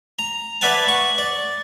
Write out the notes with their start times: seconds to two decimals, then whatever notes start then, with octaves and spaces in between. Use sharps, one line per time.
0.19 A#5
0.61 B4 D5 E5 F#5 G#5 A5
0.88 C#6
1.18 D5